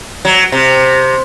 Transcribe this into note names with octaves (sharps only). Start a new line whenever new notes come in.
F#3
C3